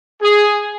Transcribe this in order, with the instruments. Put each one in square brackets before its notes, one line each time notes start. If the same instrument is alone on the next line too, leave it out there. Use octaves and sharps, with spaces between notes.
[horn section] G#4